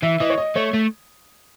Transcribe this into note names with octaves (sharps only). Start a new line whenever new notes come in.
E3 E5
E3 D#5
C#5
D#5
A3 C#5
A3